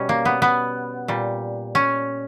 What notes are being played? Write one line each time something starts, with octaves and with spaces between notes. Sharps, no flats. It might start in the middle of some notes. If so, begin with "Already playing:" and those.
Already playing: B2 G3 C#4
A#3
B3
B3
A#2 G3
C#4